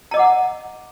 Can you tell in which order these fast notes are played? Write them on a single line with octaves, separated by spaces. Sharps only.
A#5 D#5 D6 F#5